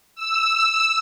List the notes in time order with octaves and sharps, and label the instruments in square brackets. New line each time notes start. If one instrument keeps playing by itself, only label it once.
[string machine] E6